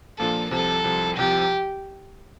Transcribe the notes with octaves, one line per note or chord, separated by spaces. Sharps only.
A#2 F3 A#3 D4 F4 A4
C2 C3 F3 A4
C2 C3 F3
C2 C3 F3 G4